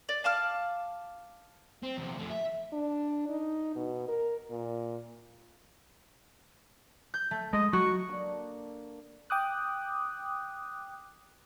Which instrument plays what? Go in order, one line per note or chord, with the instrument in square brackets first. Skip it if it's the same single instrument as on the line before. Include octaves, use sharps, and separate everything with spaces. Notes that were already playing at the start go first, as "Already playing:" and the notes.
[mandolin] D5
F5 A5 D6 F6
[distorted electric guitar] C4
E2 C3
F2 A3
E5
[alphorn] D4
D#4
B2
A#4
A#2
[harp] G6
A3
[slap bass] G#3 [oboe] D#5
[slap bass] F#3 [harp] F#4 [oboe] C#6
[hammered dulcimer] D3 A#3 D4
[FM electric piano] G5 D6 D#6 F#6